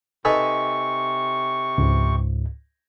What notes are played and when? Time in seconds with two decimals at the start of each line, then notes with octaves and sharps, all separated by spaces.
0.25 C3 D#4 A4 B4 G#5 C#6
1.78 C#2 G#2